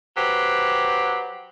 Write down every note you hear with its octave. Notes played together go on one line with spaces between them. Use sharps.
F#3 G4 B4 C5